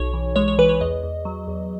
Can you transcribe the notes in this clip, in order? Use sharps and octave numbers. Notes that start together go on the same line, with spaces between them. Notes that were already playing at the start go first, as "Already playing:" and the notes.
Already playing: B1 C#5
E3
G#3 C#5
C#5
E3 B4
C#5
E2 D#5
E2
F#3
E2